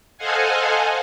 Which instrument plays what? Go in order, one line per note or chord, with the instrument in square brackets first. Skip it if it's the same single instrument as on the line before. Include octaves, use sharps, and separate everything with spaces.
[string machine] A4 C5 D#5 F5 F#5 G#5